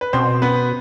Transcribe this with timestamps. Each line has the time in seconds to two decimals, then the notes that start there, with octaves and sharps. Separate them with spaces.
0.01 B4
0.13 B2 C4 C5
0.42 B3 B4